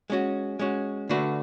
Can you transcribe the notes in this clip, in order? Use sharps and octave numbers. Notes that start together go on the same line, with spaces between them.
G#3 C#4 F#4
G#3 C#4 F#4
D3 A3 D4 F#4 B4